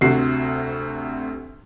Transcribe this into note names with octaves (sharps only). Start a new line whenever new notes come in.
D2 C3 F#4 C7